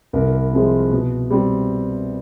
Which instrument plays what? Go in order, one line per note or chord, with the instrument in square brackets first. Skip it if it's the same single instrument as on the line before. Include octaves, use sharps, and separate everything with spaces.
[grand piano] C2 A#4
A#4
C3 F3 G#3 C4
B2
G3 C4